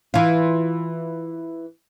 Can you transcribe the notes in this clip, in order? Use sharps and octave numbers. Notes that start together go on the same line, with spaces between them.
E3 F4